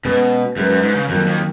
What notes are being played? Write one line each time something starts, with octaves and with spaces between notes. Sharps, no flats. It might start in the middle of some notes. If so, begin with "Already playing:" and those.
B2 G#3 C#4 G#4 B4
F#2 G#3 C#4 G#4 B4
F#2
G#2
C#3
F2 D#3 F#3 A#3
F2